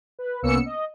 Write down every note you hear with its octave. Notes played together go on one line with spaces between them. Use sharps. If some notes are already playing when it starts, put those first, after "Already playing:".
B4
C2 A#3 B3 C#4 E6 C#7
D#5